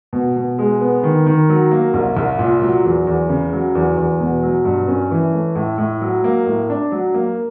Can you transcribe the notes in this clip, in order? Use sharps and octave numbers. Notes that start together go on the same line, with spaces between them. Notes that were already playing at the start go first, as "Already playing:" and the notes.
B2
B2
G#3
B3
D#3
D#3
F#3
A#3
C2
C2
A#2
F#3
E2
E2
C#3
F#3
E2
E2
B2
F#3
G2
C#4
E3
A3
A2
A2
F#3
A#3
A2
D4
F#3
A#3